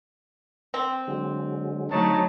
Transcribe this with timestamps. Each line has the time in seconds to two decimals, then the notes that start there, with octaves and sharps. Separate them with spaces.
0.74 C4
1.07 D3 F#3 G#3
1.91 D3 F#3 A3 C4 D#4 F#4 C#5 A5